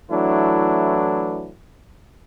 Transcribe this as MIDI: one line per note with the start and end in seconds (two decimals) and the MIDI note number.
0.11 1.52 52
0.11 1.52 54
0.11 1.52 57
0.11 1.52 62
0.11 1.52 64